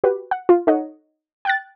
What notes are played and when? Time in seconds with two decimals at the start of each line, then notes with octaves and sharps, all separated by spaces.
0.04 F#4 G4 B4
0.31 F#5
0.49 F4
0.67 D#4 A4 C#5 D#5 F#5
1.45 G5 F#6 A6